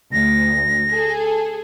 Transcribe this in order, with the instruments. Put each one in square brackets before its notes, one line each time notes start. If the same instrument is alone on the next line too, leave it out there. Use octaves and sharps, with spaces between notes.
[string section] D2 [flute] A#6
[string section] G#4 A4